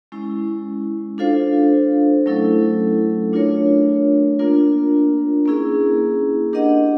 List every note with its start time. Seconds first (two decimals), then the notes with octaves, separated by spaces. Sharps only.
0.12 G#3 C#4 E4
1.18 D4 F4 A4 C5 F5
2.26 F#3 A3 C#4 E4 A4
3.32 A3 D4 F4 A#4 C#5
4.39 A#3 D4 F4 A#4
5.45 A#3 C#4 E4 G#4
6.53 D4 G4 A#4 D#5 F#5